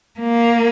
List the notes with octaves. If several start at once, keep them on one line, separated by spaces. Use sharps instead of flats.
A#3